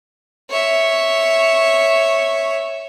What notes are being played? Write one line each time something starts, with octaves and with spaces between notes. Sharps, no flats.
C#5 E5